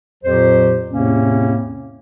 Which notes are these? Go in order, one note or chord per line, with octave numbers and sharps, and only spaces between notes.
F2 A#2 F#3 G4 C5
E2 A2 C3 A#3 C4 C#4